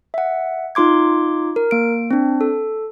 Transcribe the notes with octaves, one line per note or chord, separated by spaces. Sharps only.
E5 F#5
D#4 F4 C6 D6 G#6
A#4
A#3 D7
C4 D4
A4